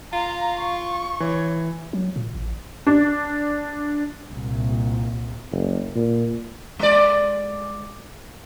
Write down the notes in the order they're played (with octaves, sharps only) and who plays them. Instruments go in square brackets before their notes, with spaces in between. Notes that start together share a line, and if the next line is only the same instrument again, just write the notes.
[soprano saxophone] F4 [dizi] F5 [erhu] A#5
[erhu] C#6
[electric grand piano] E3 [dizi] C#5
[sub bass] F#3
A#2
A1
[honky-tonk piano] D4
[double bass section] C2 A#2
[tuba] F#1
A#2
[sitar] G#3 D5